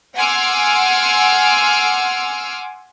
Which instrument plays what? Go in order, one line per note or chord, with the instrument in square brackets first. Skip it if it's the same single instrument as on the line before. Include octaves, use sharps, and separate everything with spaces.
[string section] F#5 G#5 C6 D6 E6 F6